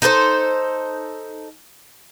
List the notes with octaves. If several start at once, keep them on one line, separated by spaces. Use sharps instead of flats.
D#4 A4 A#4 C5